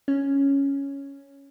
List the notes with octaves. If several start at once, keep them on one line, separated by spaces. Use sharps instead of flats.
C#4